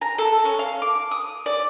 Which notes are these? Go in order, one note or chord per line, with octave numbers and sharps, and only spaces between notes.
A#5
A4
C#4
F5
D6
D#6
D5